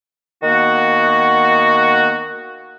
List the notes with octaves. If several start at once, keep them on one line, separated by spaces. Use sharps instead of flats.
D#3 A#3 B3 F#4